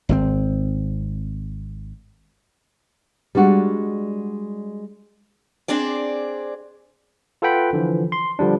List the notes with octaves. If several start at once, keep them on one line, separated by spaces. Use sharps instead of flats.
G#1 B2 C4
G3 G#3 D4 F#4
C4 D4 G#4 D5
F4 A4 B4 F#5 G5 B5
D3 E3 F3
C6
D3 F3 G3 D4